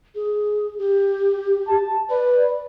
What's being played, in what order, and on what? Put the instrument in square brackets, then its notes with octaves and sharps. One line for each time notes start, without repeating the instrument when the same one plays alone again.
[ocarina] G#4
G4
[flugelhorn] A5
[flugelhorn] B4 [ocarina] D5